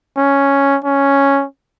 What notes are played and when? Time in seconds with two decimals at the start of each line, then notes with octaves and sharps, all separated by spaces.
0.17 C#4
0.84 C#4